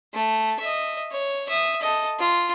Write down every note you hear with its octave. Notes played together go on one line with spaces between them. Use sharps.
A3
D#5 E5
C#5
E5 D#6
A4 D#5
F4